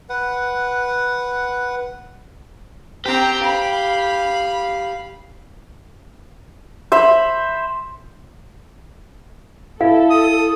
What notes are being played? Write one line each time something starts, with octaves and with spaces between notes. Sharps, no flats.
B4 F#5
C4 G4 A#5
F5 B5
C5 E5 B5
E4 A4 F5
D#6